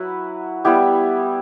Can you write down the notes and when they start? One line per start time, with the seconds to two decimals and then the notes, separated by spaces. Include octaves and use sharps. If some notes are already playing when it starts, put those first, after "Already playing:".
Already playing: F#3 E4 B4
0.64 G3 B3 E4 G4